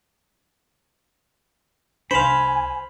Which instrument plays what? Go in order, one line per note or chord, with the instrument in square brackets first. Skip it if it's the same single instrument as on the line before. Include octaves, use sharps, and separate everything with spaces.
[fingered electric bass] C2 D4 [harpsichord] C5 F5 [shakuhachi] G#5 [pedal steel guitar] B5